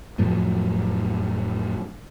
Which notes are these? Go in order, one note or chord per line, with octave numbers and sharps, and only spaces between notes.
F2 A2 F3 F#3